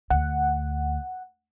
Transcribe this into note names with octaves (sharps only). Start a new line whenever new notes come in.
D2 F#5